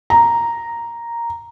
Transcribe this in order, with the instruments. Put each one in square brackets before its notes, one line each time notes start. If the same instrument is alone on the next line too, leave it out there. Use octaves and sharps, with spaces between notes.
[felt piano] A#5